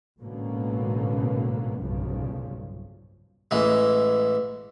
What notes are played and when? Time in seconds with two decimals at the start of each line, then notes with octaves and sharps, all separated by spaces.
0.18 A1 G#2 B2 D3 A#3 C#4
1.79 F1 B1 G2 A#2 C#3 F3
3.51 A1 E3 G#3